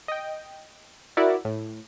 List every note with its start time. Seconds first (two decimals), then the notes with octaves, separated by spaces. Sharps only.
0.08 D#5 G5
1.17 E4 F#4 A#4 D5 E5 F#5
1.45 A2